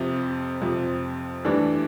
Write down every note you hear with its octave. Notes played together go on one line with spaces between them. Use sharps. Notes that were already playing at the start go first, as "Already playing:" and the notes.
Already playing: F2 C3 F3
F2 C3 F3
G2 E3 A3 D4